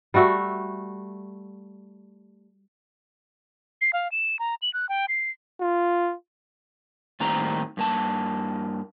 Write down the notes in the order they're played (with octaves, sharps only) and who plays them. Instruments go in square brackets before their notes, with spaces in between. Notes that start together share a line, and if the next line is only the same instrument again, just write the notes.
[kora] G3 A3 F#4 E5
[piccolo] C7
F5
E7
A#5
F#7
F#6
G5
C7
[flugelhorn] F4
[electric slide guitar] A2 D#3 G3 A#3 C4 A#5
G2 A#3 A5